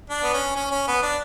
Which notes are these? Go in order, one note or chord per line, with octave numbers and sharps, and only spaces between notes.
D4
B3
C#4
C#4
C#4
B3
D4